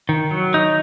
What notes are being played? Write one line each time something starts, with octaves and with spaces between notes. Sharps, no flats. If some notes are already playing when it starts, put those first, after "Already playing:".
D#3
F#3
D#4